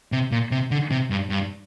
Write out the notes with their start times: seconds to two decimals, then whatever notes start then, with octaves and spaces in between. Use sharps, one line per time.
0.12 C3
0.32 A#2
0.51 C3
0.71 D3
0.91 C3
1.10 G2
1.30 G2